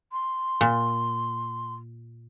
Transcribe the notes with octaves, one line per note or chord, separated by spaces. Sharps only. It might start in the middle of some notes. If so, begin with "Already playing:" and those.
C6
A#2